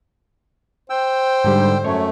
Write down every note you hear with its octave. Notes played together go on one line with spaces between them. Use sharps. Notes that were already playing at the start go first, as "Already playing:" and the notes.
C5 G5 E6
G#2 D3 G3
F#2 A3 C#5